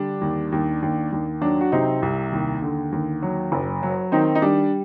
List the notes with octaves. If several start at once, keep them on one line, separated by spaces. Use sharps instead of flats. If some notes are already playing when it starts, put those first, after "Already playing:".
Already playing: D3 G3 D4
D#2
D#2
D#2
D#2
F#3 D4
F#4
C3 C4 D#4
C2
D#2
D3
D#2
F#3
F#1
F#3
D#3 C4 D#4
D#4
G3 D4